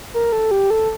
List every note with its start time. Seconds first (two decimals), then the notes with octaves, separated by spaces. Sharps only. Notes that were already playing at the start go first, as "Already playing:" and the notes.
0.14 A#4
0.32 A4
0.51 G4
0.70 A4